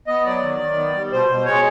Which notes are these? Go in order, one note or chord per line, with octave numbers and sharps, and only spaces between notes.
B3 D#5
F#3 D5
D#3
D#3
B3
G3
B2 C5
B2
G#3 C#5